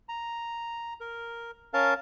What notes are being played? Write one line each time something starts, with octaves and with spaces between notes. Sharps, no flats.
A#5
A#4
C#4 A#4 F5 A5